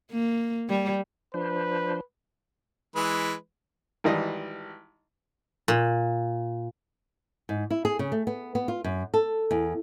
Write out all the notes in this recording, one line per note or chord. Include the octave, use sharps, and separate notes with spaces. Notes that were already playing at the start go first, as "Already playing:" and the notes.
A#3
G3
F3 D4 B4 C5
E3 G#3 B4
G#1 E3 G3 D#5
A#2
G#2
E4
G#4
C#3
A3
B3
B3
F4
F#2
A4
E2